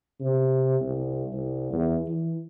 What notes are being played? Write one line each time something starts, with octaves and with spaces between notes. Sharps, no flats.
C3
C2
C2
E2
E3